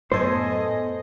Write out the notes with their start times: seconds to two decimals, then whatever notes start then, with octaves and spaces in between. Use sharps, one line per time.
0.12 F#2 A2 B3 A4 C5 D#5 G#5